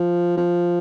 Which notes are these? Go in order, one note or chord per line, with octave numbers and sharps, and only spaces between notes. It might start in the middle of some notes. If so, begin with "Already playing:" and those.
Already playing: F3
F3